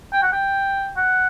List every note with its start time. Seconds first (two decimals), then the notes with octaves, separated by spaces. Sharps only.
0.13 G5
0.23 F#5
0.33 G5
0.97 F#5